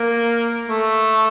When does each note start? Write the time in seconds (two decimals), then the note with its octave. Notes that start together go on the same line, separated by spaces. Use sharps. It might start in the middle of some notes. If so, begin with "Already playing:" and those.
Already playing: A#3
0.68 A3